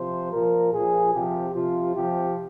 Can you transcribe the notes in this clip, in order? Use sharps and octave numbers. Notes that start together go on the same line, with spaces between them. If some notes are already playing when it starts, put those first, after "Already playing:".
Already playing: C3 F3 C5
A#2 F3 A#4
A#2 F3 G#4
C3 F3 G4
C3 F3 F4
C3 F3 G4